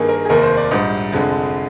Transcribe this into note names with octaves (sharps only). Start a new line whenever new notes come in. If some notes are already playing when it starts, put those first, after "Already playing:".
Already playing: G2 D#3 A#3 G#4
A#4
G#4
F1 D#2 D#3 A#3 A#4
C5
D5
A#1 G#2 G3 D#5
F1 F2 D3 G#3